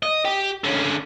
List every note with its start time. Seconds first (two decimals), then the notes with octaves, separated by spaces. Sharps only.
0.03 D#5
0.25 G4
0.64 D3 C#4